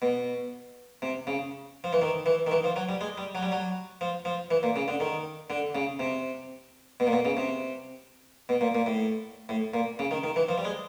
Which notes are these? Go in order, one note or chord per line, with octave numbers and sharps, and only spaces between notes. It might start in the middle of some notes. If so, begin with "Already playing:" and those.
B2
C3
C#3
F3
E3
D#3
E3
D#3
E3
F3
F#3
G3
G#3
G3
F#3
G3
F#3
F3
F3
E3
A#2
C#3
D3
D#3
D3
C#3
C3
B2
A#2
B2
C#3
C3
B2
A#2
A#2
A2
A2
A#2
C#3
D#3
D#3
E3
F3
G3
G#3